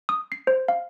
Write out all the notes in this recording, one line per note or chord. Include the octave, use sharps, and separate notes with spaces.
D#6
C7
C5
F5